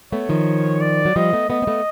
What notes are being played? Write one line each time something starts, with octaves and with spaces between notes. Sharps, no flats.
A3 B3 C#5
D#3 F3
D5
F#3
F3 G3 D#5
A3 B3
A3 B3 D#5
C4
A3 B3